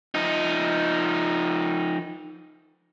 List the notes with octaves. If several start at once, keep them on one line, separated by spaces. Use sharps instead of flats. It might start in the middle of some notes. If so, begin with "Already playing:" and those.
F3 D#4